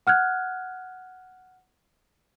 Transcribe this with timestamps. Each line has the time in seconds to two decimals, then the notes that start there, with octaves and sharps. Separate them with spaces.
0.07 F#5 F6 F#6 G#6